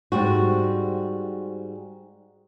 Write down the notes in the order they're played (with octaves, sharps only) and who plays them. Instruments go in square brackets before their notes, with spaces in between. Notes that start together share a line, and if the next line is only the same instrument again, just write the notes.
[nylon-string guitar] G#2 G3 C4 F#4